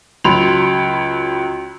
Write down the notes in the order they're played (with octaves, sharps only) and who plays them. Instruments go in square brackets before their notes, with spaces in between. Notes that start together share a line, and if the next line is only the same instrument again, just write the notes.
[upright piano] C#2 F#3 B5 C6 F7